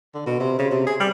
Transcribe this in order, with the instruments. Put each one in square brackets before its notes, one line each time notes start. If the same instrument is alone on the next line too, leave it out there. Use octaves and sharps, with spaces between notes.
[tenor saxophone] D3
B2
C3
C#3
C3
G#4
G3